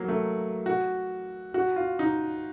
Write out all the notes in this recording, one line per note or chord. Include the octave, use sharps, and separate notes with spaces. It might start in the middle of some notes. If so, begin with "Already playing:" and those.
Already playing: F#3 A#3
A3
F#4
F#4
F4
D#4